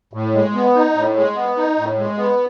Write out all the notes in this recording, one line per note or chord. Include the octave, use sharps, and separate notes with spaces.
A2
G#3
B3
D#4
A2
G#3
B3
D#4
A2
G#3
B3